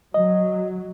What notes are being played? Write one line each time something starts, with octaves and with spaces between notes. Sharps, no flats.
F#3 D#5